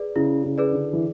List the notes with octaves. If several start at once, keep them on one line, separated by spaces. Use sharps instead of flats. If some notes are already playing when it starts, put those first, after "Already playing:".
Already playing: G#4 B4 D5
C#3 E4
C#3
G#4 B4 D5
D3
E3